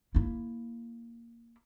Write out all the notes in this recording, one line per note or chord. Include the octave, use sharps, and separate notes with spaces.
A#3 E4